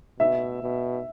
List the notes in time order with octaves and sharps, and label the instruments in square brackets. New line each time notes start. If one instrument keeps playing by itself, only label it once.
[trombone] B2 [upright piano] E5
[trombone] B2